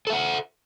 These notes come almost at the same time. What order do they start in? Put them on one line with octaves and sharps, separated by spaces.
A4 E5 F#5